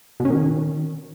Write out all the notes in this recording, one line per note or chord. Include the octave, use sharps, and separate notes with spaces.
B2
C#4
D#3